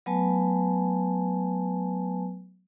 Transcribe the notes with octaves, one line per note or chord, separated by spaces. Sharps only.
F#3 A3 B3 B4 G#5 A5